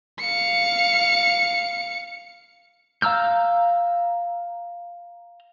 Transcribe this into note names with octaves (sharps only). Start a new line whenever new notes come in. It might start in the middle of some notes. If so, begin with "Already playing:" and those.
F5 C#7
F5 A#5 E6 F6 G6